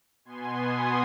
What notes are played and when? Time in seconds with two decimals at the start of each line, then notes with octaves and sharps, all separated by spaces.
0.25 B2 B3 G#5 C6
0.60 C6 D#6